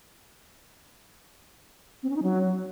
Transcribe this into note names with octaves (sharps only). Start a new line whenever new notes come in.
C4
C#4
D#4
F#3